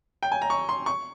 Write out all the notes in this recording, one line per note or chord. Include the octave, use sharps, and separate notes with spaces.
G5
G#5
A#5
C#6
C6
C#6